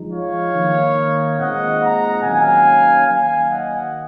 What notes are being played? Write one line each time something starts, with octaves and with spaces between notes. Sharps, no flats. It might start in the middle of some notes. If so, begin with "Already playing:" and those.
Already playing: F3 G#3 D#4
C#5 F5
D#3 A#3 D#4
A#2 G#3 C4 D#4 D#5 F#5
F#5 A#5
D#3 F#3 A#3 C#4 F5 G#5
D#3 F#3 A#3 F5 G#5
D#5 F#5